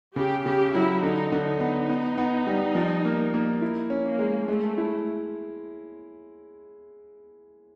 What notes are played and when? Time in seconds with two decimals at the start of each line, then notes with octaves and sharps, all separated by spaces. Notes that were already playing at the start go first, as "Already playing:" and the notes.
0.16 C#3 G4
0.45 C#3 G4
0.75 F#3 E4
1.03 D3 D#4
1.32 D3
1.46 D#4
1.60 B3
1.89 B3
2.18 B3
2.47 G3
2.75 F3
3.05 A#3
3.34 A#3
3.61 E4
3.90 C#4
4.05 A#3
4.19 G#3
4.48 G#3 A3
4.78 E4